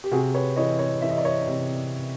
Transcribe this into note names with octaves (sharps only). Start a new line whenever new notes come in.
G4
C3 F#4 G#4
B4 C#5
E3 C#5 D#5
C#5 D#5
E3 E5
D#5
D5
C#5 D#5
C3